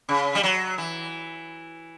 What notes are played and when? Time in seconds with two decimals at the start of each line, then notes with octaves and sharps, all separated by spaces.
0.09 C#3
0.35 G3
0.43 F#3
0.78 E3